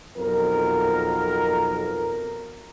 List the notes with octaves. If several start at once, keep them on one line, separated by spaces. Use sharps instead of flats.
B1 F2 A#4